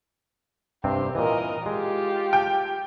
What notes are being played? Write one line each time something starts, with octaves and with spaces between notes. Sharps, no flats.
G2 C3 C4 G4 C5
A#2 E3 A#4 D#5
G#3 F4 G4
G5